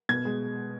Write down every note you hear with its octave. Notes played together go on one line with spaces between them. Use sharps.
B2 G#6
G#3